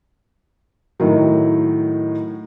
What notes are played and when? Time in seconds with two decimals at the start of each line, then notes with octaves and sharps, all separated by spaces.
1.00 A2 D#3 F#3